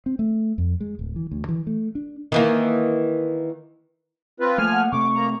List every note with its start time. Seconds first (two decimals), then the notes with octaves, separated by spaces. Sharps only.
0.06 C4
0.19 A3
0.58 F2
0.80 G#3
0.99 D1
1.16 E3
1.31 D2
1.49 E3
1.67 A3
1.95 D4
2.32 D#3 E3 A#3
4.40 C4 F4 B4
4.58 F3 A3 A#3 G#5 F6
4.72 F#5
4.92 C3 A3 C#6 D6
5.15 A#3 A#5